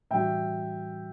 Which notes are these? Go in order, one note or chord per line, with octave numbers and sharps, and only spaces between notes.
A2 E3 G3 D4 F#4 E5 G5